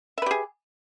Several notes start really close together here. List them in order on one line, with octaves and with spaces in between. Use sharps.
E5 B4 G4 G#4